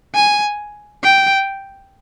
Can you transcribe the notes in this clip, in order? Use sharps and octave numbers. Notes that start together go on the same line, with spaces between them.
G#5
G5